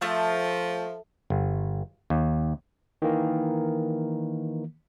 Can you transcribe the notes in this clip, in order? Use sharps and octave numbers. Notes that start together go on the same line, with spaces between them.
F3 A3
G1
D#2
D#3 E3 A#3